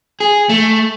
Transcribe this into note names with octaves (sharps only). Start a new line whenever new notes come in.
G#4
A3